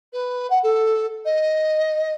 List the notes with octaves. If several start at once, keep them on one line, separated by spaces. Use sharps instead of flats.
B4
F#5
A4
D#5